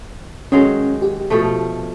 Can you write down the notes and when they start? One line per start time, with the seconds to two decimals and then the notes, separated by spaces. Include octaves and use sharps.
0.52 D#3 F#3 G#3 C#4
1.02 G4
1.30 B2 F3 A3